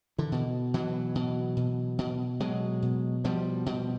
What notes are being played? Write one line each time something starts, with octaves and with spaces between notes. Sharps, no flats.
D3 E3
B2
B2 E3 F#3
B2
B2
B2
B2 F#3 G#3
B2
B2 F3 G3
B2